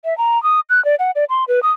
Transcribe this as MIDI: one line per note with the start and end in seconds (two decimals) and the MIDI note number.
0.05 0.16 76
0.18 0.41 82
0.43 0.60 87
0.70 0.83 90
0.85 0.95 74
0.99 1.11 78
1.15 1.24 74
1.29 1.44 84
1.48 1.62 71
1.63 1.72 87